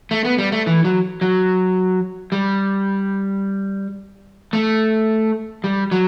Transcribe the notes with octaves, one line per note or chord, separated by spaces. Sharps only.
A3
B3
G3
A3
E3
F#3
F#3
G3
A3
G3
F#3